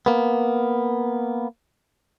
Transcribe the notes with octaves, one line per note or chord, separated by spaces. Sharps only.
A#3 B3